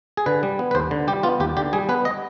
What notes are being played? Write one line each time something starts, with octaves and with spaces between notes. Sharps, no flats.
G#4
D3 B4
G3
B3
B4
D#2 C5
D3
G3 G4
B3 F4
D#2 G4
D3 G4
G3 G#4
B3 B4
D#5